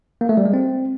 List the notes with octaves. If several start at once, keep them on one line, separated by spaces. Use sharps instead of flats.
A#3
A3
G3
G#3
C4